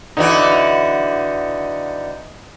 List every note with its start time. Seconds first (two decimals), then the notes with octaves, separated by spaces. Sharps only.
0.17 D3 E3 D#4 F#4